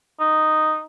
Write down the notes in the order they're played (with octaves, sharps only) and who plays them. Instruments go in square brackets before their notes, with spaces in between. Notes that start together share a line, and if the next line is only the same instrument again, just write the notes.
[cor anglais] D#4